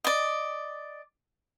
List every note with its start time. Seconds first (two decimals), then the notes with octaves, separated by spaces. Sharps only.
0.04 D5 D#5